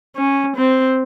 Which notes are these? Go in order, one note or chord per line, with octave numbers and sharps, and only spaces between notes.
C#4
C4